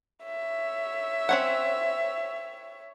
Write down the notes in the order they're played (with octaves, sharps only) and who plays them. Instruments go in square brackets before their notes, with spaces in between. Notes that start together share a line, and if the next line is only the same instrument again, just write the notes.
[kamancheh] C#5 E5
[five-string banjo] C4 C#4 F#5